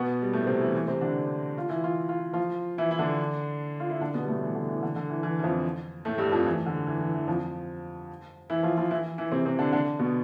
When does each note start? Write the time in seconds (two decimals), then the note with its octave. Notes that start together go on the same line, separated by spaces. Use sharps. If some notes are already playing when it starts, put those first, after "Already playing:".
Already playing: B2 B3
0.22 G3
0.33 A2 A3
0.47 C3 C4
0.61 E3 E4
0.74 E3 E4
0.88 C3 C4
1.01 D3 D4
1.58 F4
1.69 E3 E4
1.84 F4
2.09 F4
2.33 F3 F4
2.78 E3 E4
2.91 E4
2.99 D3 D4
3.80 F4
3.90 E4
4.01 D3 D4
4.14 B2 B3
4.23 G3
4.28 A2 A3
4.42 E3
4.55 D3
4.69 E3
4.83 D3
4.96 D3
5.10 E3
5.23 E3
5.39 E3
5.43 F2 F3
6.05 A2 A3
6.18 G2 G3
6.32 F2 F3
6.46 E3
6.66 D3
6.87 E3
7.00 E3
7.14 E3
7.28 F2 F3
8.50 E3 E4
8.63 F3 F4
8.77 F3 F4
8.91 E3 E4
9.18 E3 E4
9.32 C3 C4
9.45 C3 C4
9.59 D3 D4
9.73 D3 D4
9.99 B2 B3